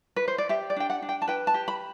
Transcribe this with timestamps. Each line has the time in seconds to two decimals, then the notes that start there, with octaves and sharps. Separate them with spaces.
0.16 B4
0.28 C5
0.38 D5
0.49 G4 E5
0.70 D5
0.77 D4 G5
0.90 F#5
1.02 D4
1.09 G5
1.22 A5
1.28 B4 G5
1.47 A5
1.54 G4
1.68 B5